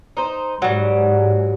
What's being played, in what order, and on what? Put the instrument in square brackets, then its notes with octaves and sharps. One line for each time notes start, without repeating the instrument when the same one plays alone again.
[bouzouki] D#4 C5
[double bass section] G#2 [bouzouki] F#3 G3